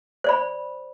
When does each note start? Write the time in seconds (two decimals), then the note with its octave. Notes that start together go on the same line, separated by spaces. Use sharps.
0.24 C5 D5 B5